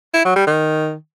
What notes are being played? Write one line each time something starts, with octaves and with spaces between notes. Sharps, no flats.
E4
F#3
G3
D#3